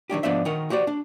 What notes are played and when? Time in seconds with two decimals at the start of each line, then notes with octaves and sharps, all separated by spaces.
0.10 D#3 F#3 D4 G4
0.23 G#2 F3 B3 D4 D5 E5
0.45 D#3 F#4 A#4 F#5
0.70 F#4 G4 C5 D5
0.87 D4